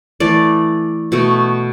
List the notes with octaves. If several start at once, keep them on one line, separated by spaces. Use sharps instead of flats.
E3 A3 D5
B2 A3